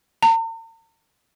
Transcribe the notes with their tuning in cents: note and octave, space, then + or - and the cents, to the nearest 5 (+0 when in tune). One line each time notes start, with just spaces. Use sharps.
A#5 -45